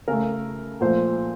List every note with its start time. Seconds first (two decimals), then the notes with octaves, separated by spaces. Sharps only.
0.08 C#3 A3 A#4
0.81 A#2 F3 A3 C5